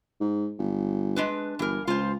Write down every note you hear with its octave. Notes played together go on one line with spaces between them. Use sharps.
G#2
G1
G#3 D4 B4
G1 E3 A#4
C#2 F4 C5